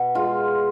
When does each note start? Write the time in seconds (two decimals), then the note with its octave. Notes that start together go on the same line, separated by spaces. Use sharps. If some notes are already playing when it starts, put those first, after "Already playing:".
Already playing: B2
0.15 G#3 F4